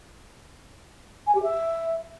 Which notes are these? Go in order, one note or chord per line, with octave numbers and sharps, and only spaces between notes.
G#5
G4
E5